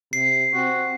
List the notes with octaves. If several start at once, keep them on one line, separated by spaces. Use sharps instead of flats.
C3 C7
C4 F#4